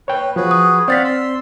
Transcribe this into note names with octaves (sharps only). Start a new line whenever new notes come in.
B4 C#5 G5
F3 F#4 G#4 B4
D#6
C4 D5 F5 F#5 F6 A6 B6
C6 E6